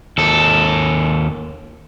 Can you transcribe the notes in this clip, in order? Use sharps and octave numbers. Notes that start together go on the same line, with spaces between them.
D#2 A4